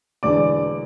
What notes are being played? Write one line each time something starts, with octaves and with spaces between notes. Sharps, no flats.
E1 E2 D3 D5 D6